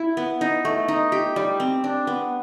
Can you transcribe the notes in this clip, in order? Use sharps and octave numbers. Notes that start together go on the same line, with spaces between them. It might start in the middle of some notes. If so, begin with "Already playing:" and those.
Already playing: E4
B3
D#4
A3
D#4
G4
G3
C4
D4
B3